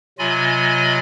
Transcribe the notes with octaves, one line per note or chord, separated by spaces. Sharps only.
C3 F#3 F4 D#5 G#5 B5